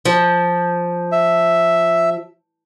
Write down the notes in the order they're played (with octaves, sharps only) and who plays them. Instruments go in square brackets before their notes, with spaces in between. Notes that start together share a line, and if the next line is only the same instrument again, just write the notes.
[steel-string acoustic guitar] F3
[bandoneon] E5